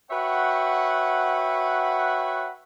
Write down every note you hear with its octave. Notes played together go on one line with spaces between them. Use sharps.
F#4 B4 C#5 E5 F#5 G5